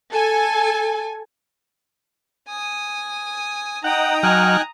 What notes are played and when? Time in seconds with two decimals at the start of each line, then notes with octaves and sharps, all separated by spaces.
0.11 A4 G#5
2.48 G#5 D#6
3.84 D#4 F#5 G5 A#5 D#6
4.23 F#3 G#5 F6 F#6